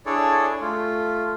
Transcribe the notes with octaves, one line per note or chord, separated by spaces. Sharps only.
D4 E4 G#4 A4 C#5 D5
A3 F4